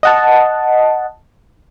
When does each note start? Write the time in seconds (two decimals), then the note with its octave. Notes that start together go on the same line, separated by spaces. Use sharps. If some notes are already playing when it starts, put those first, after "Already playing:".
0.03 D#5 F#5 A5